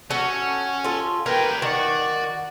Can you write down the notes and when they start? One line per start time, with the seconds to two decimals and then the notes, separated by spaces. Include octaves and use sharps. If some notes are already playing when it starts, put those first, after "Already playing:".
0.11 C#4 F#4 A4
0.84 F4 A4
1.26 G4 A#4 B4 C#5 G5
1.62 D#3 F#4 D5 F#5